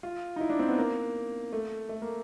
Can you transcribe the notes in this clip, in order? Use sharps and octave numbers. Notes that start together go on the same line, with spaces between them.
F4
D#4
E4
D4
C4
B3
A#3
A3
A3
A#3